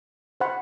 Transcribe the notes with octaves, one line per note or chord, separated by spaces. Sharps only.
C5 F#5 B5